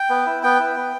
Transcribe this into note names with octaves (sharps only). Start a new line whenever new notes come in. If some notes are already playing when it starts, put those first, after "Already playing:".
Already playing: G5
B3
E4
B3 G5
E4
B3